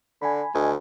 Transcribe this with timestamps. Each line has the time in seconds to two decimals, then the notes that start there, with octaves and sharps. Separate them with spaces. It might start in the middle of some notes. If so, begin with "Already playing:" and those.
0.22 D3 G#5 B5
0.55 D2 D#5 G#5